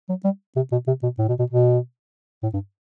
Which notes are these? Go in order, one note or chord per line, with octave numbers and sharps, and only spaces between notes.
F#3
G3
C3
B2
C3
B2
A2
B2
B2
B2
A2
G2